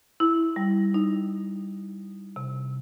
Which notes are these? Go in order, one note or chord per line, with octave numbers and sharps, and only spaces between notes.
E4
G3
D#4
C3